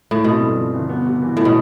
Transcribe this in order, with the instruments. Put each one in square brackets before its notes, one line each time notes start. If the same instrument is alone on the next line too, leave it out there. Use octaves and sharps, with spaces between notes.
[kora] A2
[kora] B2 [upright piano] C4
[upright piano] G2
F3
G1
B3
C3
E3
[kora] A2
B2